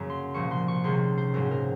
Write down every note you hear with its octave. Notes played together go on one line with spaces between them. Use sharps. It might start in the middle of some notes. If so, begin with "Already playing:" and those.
Already playing: F#2 C#3 F#3 A#3 A#5
C6
C2 A#2 F3 A#3 C#6
C6
C#6
C#2 C3 D#3 C6
C5
A#1 G#2 F#3 A#3 A#4
A#4